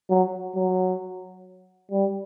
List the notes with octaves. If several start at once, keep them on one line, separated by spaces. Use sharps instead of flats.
F#3
F#3
G3